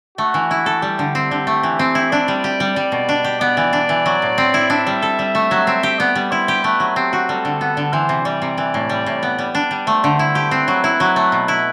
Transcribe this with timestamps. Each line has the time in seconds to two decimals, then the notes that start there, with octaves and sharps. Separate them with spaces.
0.18 A3 F#4
0.34 E3
0.51 E4
0.66 A4
0.82 G3 G4
0.99 D3
1.15 C4
1.31 D3
1.47 A3
1.63 E3
1.79 C4
1.95 E4
2.11 D4 D5
2.28 G3
2.44 G4
2.60 G3
2.76 G3
2.92 B2
3.09 D4
3.24 G4
3.40 B3 D5
3.57 E3
3.73 D4
3.89 E3
4.06 F#3
4.22 A2
4.38 C4
4.54 E4
4.70 D4 E5
4.87 G3
5.02 A4
5.19 G3
5.35 A3
5.51 F#3
5.67 C4
5.83 G4
5.99 B3 D5
6.15 G3
6.31 E4 C5
6.48 G4
6.64 A3 B4
6.80 F#3
6.96 C4 G4
7.13 F#4
7.29 G3 A4
7.45 D3
7.61 B3
7.77 D3
7.93 E3 C5
8.09 C3
8.25 G3 D5
8.42 C3
8.57 E3
8.74 A2
8.89 G3
9.06 A2
9.23 B3
9.38 G3
9.55 D4
9.71 G3
9.87 A3 C5
10.04 D3
10.19 E4
10.35 G4
10.51 C4 B4
10.68 F#3
10.84 E4
11.00 F#3
11.16 A3
11.32 B2
11.48 E4